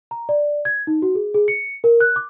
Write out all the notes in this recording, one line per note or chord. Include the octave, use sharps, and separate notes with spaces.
A#5
D5
G#6
D#4
F#4
G#4
G#4
C#7
A#4
F#6
D6